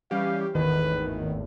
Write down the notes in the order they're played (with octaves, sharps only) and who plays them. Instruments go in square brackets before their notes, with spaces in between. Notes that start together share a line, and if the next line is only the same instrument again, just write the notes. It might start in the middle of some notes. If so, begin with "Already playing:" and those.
[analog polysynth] E3 G3 C#4 [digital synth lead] G4 [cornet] F5
[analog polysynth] G#1 E2 A2 [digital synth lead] D#3 [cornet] B4